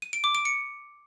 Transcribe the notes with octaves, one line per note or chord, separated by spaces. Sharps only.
D#7
D7
D6
D7
C#7